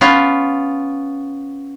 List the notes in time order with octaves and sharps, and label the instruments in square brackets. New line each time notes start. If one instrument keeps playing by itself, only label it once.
[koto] B3 C#4 F4